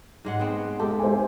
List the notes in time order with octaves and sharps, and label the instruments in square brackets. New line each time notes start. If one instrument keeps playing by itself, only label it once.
[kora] G#2 G#3 F#5
B3 C4
[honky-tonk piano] G#3 A4 [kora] G4
[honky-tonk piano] C5 G#5